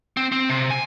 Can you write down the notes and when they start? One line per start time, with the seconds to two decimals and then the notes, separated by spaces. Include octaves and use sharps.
0.17 C4
0.32 C4
0.49 C3
0.71 G#5